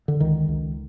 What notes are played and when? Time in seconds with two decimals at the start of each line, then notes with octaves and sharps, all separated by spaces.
0.08 D3
0.20 C#2 D#3
0.48 C#2